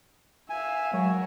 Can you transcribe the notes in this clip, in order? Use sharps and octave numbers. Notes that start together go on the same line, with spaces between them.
E5 F5 G#5
F#3 G#3 A#4 C#5 F#5